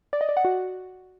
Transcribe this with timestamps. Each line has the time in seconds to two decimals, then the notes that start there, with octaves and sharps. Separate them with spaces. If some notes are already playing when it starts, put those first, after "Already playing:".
0.13 D5
0.21 D#5
0.29 D5
0.37 F#5
0.45 F#4